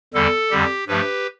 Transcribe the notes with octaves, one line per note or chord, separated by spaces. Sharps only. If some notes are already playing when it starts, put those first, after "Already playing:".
E2 D3 G3 A4
F2 D3 G3 G4
G2 F3 A3 G4 B4